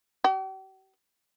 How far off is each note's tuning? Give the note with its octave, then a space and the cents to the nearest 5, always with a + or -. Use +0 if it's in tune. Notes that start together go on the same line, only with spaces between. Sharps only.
G4 -45